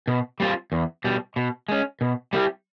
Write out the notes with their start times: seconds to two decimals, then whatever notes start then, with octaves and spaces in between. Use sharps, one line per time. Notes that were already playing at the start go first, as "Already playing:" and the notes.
0.08 B2
0.40 G3 C4 F4
0.72 E2
1.04 B2 G3
1.36 B2
1.69 G#3 C#4
2.01 B2
2.33 G3 C4 E4 G4